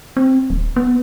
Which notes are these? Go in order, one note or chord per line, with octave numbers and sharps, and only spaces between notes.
C4
D1
B3